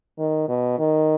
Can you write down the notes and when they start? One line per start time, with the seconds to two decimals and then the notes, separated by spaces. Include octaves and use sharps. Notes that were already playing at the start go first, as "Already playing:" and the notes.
0.19 D#3
0.48 B2
0.79 D#3